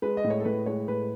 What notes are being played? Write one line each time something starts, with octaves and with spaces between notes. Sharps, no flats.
G#3 B4
D#5
A2
C#5
A4
A2 B4
G#3 C#5
A2 B4